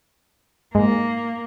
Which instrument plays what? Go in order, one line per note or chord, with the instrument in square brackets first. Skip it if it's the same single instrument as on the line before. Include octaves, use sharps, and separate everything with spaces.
[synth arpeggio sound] G#2 [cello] A#3